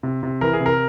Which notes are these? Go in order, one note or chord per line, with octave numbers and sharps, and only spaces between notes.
C3
C3
E3 A#4
G#4
C3
A#4